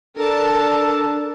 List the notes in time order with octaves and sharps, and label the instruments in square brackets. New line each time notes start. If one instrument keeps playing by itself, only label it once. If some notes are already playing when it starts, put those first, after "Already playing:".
[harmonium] D4 A4 [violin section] A#4 A5